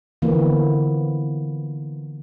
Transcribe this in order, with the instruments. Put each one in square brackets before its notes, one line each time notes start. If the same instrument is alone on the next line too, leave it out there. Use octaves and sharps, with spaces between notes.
[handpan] D3 E3 F3 A#3 B3 E4